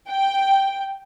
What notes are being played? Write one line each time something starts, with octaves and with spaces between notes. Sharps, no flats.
G5